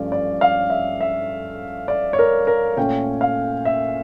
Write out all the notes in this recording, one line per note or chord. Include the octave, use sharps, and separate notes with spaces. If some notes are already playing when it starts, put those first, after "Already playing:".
Already playing: G2 F3 A3 C#4 D5
D5
F5
E5
E5
D5
C#5
A#4
A#4
A#2 A3 C#4 G5
F5
E5